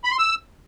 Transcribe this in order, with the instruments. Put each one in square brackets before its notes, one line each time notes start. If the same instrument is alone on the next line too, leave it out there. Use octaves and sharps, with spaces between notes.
[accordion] B5
C6
E6